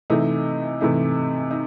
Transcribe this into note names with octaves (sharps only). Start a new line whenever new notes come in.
C3 E3 A3 D#4
C3 E3 A3 D#4
D#4